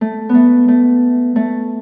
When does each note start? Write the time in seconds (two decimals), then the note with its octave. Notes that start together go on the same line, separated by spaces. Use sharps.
0.01 A3
0.29 B3
0.34 A3
0.68 A3
1.36 A3